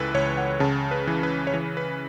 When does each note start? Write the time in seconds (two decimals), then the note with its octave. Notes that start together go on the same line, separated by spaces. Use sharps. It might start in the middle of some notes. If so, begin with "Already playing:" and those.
Already playing: C#2 E3 A4 B4
0.14 C#2 C#5
0.37 F#5
0.60 C#3 A5
0.91 B4
1.07 E3
1.23 B4
1.47 C#5
1.54 E3 B4
1.77 B4